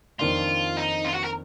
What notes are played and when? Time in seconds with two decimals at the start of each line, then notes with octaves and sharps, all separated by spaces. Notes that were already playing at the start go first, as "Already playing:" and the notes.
0.19 F2 D#3 A#3 D4 F4
0.77 D#4
1.05 F4
1.14 F#4
1.24 A#4